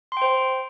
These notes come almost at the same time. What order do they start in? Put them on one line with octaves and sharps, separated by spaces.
C6 G5 C5